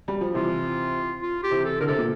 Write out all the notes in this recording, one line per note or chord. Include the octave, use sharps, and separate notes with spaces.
G3
F3
C3 E3 F4
F4
G4
C3 E3
A4
D3 A#4
C3 A4
A#2